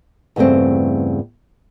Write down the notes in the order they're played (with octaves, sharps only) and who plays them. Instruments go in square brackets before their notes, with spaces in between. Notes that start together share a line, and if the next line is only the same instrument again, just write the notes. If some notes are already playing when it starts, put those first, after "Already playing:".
[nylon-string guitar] E2 G2 C#3 A3 C4